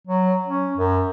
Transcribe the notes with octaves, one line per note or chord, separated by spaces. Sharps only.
F#3
C#4
F#2